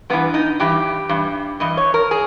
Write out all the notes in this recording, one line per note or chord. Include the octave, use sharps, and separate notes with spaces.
G2 E3 B3
D#4
G2 E3 G4
G2 E3
G2 E3 D#5
C#5
A#4
G#4